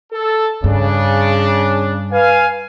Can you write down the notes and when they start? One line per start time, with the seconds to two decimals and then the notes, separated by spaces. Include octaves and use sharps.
0.13 A4
0.64 G2 C#3 D4
2.12 B4 F5 G#5